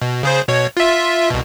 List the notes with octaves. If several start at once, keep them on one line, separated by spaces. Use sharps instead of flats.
B2
C#3 G#4 C5
B2 C#5
F4 E5
C2 B2